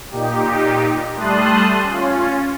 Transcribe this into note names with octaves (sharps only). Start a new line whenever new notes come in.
A#2 D#4 G4
G3 A3 A5 C6 D#6 F#6
C#4 F4